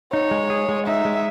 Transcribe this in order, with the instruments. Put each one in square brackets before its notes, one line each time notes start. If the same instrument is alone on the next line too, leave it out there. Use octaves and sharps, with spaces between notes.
[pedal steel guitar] D#4 [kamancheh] C#5
[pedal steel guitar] G#3
G#4
G#3
[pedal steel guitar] D#4 [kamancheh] E5
[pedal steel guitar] G#3